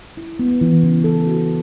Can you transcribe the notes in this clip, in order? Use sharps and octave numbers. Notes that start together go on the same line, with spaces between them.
E4
B3
E3
C#3
A4
F#4